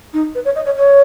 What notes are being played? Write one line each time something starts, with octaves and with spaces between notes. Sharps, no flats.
D#4
B4
C#5
D#5
C#5
C#5